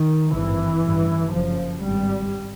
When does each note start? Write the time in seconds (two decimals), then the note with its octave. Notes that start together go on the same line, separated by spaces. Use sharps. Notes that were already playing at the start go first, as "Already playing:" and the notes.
Already playing: D#3
0.33 G#1 G2 E3
0.84 A1 G2
1.33 F#1 F#2 C#3 F3
1.83 G#1 G2 G3